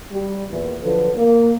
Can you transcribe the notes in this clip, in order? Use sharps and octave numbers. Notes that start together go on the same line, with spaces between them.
G3 G4
E2 A#2 E3
D3 F3 F#3 F4 A4 B4
A#3